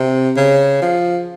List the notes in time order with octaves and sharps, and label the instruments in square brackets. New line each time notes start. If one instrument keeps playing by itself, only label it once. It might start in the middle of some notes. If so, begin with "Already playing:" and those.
Already playing: [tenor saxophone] C3
C#3
F3